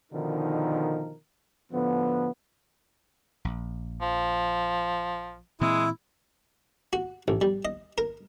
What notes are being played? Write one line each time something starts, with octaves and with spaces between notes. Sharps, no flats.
B2 D3 D#3 F3 D#4 A#4
A2 D3 F3 B3
A#1
F3
A#2 E3 G#3 C4 E4
F#4
A1
G3
D#5
A#4